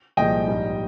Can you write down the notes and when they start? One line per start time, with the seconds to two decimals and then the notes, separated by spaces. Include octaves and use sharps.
0.17 C2 A#2 F3 G#3 D#5 G5
0.47 A#1 G#2 G3